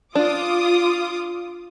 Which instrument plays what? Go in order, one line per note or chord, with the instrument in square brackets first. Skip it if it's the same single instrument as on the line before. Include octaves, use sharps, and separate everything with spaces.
[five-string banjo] D4 [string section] F4 D6 D#6